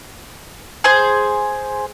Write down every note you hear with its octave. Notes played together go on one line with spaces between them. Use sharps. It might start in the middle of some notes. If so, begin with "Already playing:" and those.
G#4 C5